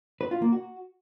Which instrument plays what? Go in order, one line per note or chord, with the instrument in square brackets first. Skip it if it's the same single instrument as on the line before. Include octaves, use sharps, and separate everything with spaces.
[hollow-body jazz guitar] B4
F4
A#3
F#4